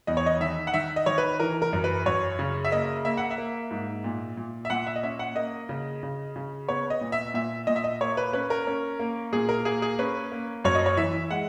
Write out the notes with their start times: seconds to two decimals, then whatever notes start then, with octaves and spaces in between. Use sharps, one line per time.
0.07 E2 D#5
0.17 C#5
0.26 D#5
0.41 D#3 E5
0.67 F#5
0.74 D#3 E5
0.96 D#5
1.06 D#3 C#5
1.18 B4
1.40 E3 A#4
1.62 A#4
1.73 F#2
1.84 B4
2.06 F#2 C#5
2.39 C#3
2.65 E5
2.72 A#3 D#5
3.05 A#3 E5
3.17 F#5
3.31 E5
3.38 A#3
3.71 G#2
4.04 A#2
4.37 A#2
4.65 E5
4.70 A#2 F#5
4.87 E5
4.96 D#5
5.03 C#4 E5
5.19 F#5
5.36 A#3 D#5
5.69 C#3
6.03 C#3
6.36 C#3
6.68 B3 C#5
6.90 D#5
7.01 A#2
7.12 E5
7.34 A#2 E5
7.67 A#2 D#5
7.76 E5
7.84 D#5
8.01 A#3 C#5
8.17 B4
8.33 C#4 B4
8.50 A#4
8.67 C#4
8.99 A#3
9.33 A#2 G#4
9.49 A#4
9.65 A#3 G#4
9.82 G#4
9.99 C#4 B4
10.32 A#3
10.64 F#2 C#5
10.75 D#5
10.86 C#5
10.97 E3 E5
11.31 G#3 F#5